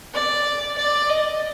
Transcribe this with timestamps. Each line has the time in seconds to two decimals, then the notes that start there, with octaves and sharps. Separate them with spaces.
0.15 D5
0.78 D5
1.10 D#5